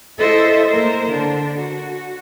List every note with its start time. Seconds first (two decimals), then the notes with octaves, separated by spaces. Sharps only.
0.18 E4 A4 C5 D#5 E5
0.68 A#3 A#4 C5
1.09 D3 D4
1.56 F#4